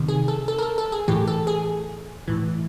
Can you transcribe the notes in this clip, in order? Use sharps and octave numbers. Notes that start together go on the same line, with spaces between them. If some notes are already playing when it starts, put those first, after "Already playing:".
Already playing: C3 D#3
G#4
A4
A4
A#4
A4
A4
G#4
A2 E3 G4
A4
G#4
A2 E3